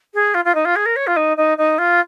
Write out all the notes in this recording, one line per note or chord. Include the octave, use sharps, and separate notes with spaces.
G#4
F4
F4
D#4
F4
G#4
A#4
C#5
F4
D#4
D#4
D#4
F4